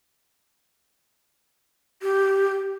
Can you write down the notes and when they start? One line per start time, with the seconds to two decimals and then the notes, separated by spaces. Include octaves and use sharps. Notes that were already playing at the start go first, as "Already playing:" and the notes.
2.03 G4